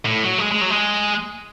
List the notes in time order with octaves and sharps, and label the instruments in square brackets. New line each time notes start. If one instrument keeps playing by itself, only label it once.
[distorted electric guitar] A2
F#3
A3
G#3
G#3
F#3
G#3